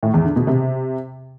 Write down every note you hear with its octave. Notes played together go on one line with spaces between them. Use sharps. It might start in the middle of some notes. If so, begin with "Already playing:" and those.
A2
E2
D3
B2
C3